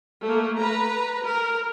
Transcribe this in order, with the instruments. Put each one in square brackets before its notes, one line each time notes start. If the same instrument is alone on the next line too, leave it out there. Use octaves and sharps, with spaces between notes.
[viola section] A3 A#3
B4 A#5
A#4